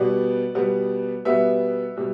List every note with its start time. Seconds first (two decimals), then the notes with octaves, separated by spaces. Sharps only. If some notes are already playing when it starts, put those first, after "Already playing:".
Already playing: B2 G3 B3 D5
0.55 B2 G3 B3
1.25 B2 G3 B3 E5
1.97 B2 G3